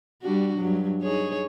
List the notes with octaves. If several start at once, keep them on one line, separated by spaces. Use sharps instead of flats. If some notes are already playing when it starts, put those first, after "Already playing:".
G3 D4 F#4
G2 F#3
D#4 G#4 C#5